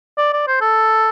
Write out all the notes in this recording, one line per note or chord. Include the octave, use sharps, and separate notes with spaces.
D5
D5
C5
A4